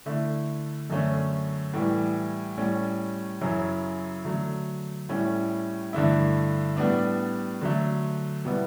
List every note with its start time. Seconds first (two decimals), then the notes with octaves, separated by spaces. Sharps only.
0.06 D3 A3 E4
0.90 F#2 D3 A3 C#4
1.74 A2 E3 G3
2.57 A2 G3 C#4
3.41 F#2 C#3 F#3 C#4 E4
4.25 D3 F#3 A3
5.09 A2 G3 C#4 E4
5.93 G2 D3 A3 E4
6.77 A2 G3 B3 D4
7.61 D3 F#3 A3
8.45 B2 G3 B3 E4